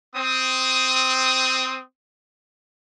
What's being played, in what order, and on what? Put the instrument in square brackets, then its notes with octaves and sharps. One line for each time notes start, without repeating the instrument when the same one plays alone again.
[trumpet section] C4 D#6